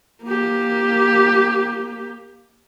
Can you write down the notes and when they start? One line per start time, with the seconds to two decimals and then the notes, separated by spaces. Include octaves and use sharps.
0.24 A#3 G4